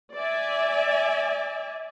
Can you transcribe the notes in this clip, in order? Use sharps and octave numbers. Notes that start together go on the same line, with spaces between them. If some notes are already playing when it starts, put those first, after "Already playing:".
D5 E5 G#5